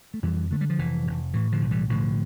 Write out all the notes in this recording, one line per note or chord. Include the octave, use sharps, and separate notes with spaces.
A3
F2 E3 G3
D3 A3
G3
F3
F1 E3
F1
A2 E3
D3 F3
B1
E3 G3
A2 D3 F3